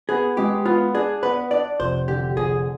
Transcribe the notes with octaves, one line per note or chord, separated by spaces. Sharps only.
B3 G#4
G#3 G4
B3 F4
D4 G#4
B3 B4
D4 D5
F1 C5
D3 G4
F1 G#4